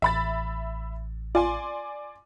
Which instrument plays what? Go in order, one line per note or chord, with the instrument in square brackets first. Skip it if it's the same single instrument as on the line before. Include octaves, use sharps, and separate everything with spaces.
[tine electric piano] A1 [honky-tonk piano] E5 B5 A6
[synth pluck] F4 [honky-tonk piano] D5 G#5 C6